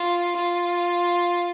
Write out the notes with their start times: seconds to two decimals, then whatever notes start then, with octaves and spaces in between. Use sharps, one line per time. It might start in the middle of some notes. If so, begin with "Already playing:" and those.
Already playing: F4
0.37 F4